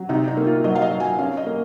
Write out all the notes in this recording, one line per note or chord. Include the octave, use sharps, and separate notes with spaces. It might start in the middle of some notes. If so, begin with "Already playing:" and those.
Already playing: F#3
C3 D#4
D#4
A#3
F4
F#3 D#5
F5
D#5
F#3
G#5
C#4 F5
D#5
A#3